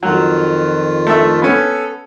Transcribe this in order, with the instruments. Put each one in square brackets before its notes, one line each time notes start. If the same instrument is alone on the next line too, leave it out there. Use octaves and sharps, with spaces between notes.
[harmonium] F2 D#3 F4 [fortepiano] F#3
[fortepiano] A3 E5
[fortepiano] B3 C#4 [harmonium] A4